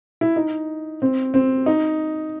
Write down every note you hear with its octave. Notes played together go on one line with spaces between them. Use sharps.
E4
D#4
C4
C4
D#4